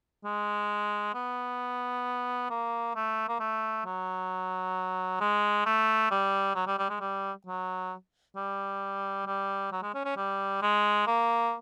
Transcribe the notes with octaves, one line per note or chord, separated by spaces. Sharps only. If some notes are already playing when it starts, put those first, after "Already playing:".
G#3
B3
A#3
A3
A#3
A3
F#3
G#3
A3
G3
F#3
G3
G3
G#3
G3
F#3
G3
G3
F#3
G#3
C#4
C#4
G3
G#3
A#3